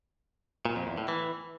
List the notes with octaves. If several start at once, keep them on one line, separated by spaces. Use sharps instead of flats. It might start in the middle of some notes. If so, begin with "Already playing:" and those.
A#2
F2
E2
A2
E3